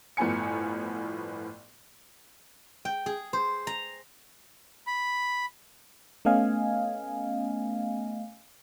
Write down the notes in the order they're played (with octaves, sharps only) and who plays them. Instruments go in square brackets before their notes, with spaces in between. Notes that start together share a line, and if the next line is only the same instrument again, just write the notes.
[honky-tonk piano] G1 A2 F3 B3 G#5 C#7
[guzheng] G5
G#4
C5
A#5
[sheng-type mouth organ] B5
[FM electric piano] A3 B3 C#4 D#5 F5 G#5